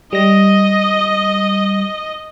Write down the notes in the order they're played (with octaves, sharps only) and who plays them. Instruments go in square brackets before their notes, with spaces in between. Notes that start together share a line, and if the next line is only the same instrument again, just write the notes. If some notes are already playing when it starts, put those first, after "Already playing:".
[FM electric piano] G3 A#6 [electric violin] D#5